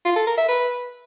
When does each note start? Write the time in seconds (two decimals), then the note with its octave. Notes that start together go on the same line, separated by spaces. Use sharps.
0.05 F4
0.16 A4
0.27 A#4
0.38 E5
0.49 B4